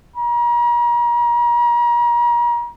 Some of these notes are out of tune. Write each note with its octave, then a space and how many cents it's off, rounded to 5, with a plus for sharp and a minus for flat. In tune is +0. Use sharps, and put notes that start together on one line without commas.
A#5 +40